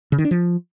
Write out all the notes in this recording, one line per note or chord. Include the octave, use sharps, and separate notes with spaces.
C#3
D#3
D4
F3